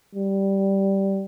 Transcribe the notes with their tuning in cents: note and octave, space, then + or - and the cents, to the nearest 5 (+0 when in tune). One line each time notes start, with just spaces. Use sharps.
G3 -5